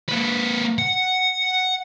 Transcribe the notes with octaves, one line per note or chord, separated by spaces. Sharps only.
A#3 B4
F#5